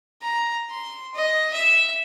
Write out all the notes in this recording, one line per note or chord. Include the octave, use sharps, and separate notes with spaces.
A#5
C6
D#5
E5